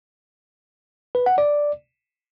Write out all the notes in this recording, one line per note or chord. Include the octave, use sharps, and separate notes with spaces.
B4
F#5
D5